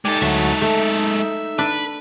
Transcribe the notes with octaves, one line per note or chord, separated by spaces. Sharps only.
G#3 D#4 G4 A4 D5 G#5
D2 F#3 E5
A3 E5
D4 B4